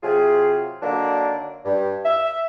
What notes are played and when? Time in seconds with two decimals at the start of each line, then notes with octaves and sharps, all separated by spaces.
0.03 C3 F#3 F4 G#4
0.82 D3 D#3 F#3 A#3 D4
1.65 G2
2.05 E5